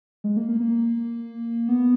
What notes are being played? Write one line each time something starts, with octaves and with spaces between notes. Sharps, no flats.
G#3
A#3
A#3
A#3
B3